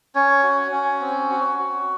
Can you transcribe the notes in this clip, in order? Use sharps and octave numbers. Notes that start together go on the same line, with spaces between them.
C#4 C#5
F#4
C#4
C4
F#4
F#4